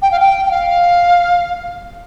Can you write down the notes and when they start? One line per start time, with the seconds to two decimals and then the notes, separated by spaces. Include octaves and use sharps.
0.02 G5
0.12 F5
0.20 G5
0.46 G5
0.51 F5